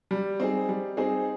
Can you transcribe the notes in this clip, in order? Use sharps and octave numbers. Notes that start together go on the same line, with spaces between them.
G3
C4 D#4 G#4
G3
C4 D#4 G#4